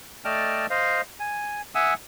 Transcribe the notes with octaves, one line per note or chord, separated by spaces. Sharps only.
A3 D5 D#5 G5 A5 F6
C5 D#5 F5
G#5
E5 F#5 G#5 D#6 E6